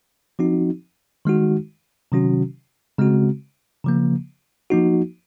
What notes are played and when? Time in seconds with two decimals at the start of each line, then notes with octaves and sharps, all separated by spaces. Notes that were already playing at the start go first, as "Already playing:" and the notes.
0.39 F3 C4 D#4 F#4
1.25 D#3 G#3 D#4 F#4
2.12 C3 D#3 F#3 C#4 F#4
2.98 C#3 G#3 C4 F#4
3.84 C#3 F3 A#3
4.70 F3 A#3 D#4 F#4